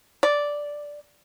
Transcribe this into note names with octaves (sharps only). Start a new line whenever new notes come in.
D5